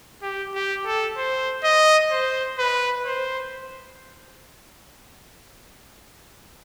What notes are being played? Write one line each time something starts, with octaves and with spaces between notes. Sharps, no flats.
G4
G4
A4
C5
D#5
C5
B4
C5